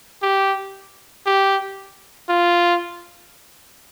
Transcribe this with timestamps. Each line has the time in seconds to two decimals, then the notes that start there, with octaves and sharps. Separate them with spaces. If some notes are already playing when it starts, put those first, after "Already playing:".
0.23 G4
1.26 G4
2.29 F4